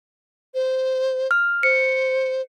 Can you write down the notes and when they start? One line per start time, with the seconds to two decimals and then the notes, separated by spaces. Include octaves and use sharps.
0.54 C5
1.31 F6
1.63 C5 C#7